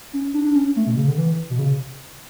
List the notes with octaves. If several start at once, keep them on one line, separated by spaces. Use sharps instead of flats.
C#4
D4
D4
C#4
A3
B2
C#3
D3
E3
B2
C#3